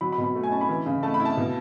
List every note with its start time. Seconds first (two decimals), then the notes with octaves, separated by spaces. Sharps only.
0.01 F#3 B5
0.12 B5
0.18 B2
0.24 B5
0.35 A3
0.43 G#5
0.52 C#4 A5
0.61 B5
0.69 E3
0.86 C#3
1.03 A3 A5
1.14 B5
1.20 E4
1.25 A5
1.37 B2